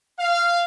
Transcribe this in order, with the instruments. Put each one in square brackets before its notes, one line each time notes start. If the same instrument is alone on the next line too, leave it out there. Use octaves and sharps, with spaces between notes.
[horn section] F5